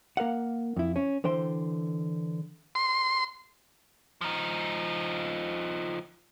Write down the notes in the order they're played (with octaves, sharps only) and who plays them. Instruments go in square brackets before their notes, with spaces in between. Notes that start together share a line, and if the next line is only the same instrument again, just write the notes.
[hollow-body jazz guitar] A#3 A#4 F5 F#5
F2 E4
C#4
D3 E3 C5 G5 C6
[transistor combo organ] C6
[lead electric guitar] F3 D#4